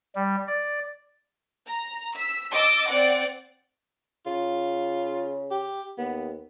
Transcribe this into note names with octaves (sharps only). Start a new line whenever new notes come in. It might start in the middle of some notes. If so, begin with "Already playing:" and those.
G3
D5
A#5
E6 B6
D#5 D6 E6 A6
C4 D5 F#5
C#3 F4
G4
D#2 B3